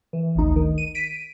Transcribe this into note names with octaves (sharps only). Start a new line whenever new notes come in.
E3
G#1 D2 D#4
D#3
D#7
B6 D7 D#7